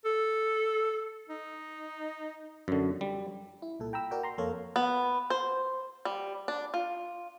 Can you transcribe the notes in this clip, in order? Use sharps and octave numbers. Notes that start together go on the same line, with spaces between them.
A4
D#4
F#2 D3
G3
E4
C2 A#2 A4
G5 A#5 B5 E6
F#4 A#4 D5 G5
A#5 C6
F2 A#3 A4 A#4 C#5 F5
B3
C5
G3
D4
F4